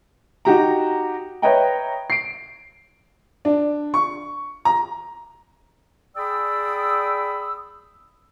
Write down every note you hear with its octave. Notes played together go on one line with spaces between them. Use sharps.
D#4 F#4 G4 A#5
B4 C#5 D#5 E5 G5 A#5
C7 D7
D4
C#6
A#5
G#4 D5 G5 B5 D#6 E6